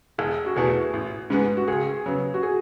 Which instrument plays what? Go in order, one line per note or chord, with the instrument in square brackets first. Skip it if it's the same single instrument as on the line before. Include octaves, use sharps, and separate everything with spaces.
[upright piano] E1 [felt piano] G#4
[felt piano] F#4
[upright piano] E2 B2 A3 E4 [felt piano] G#4
[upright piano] A1
G#2 G#3 B3
[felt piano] F#4
[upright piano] C#2 [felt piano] G#4
[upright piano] C#3 F#3 B3
[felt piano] F#4
G#4